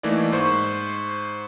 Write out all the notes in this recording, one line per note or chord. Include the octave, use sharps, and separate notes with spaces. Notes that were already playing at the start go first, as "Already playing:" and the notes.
E3 A3 A#3 D#4 E4 D5
G#2 C5 C#6